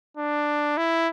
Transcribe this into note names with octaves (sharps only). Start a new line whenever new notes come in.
D4
E4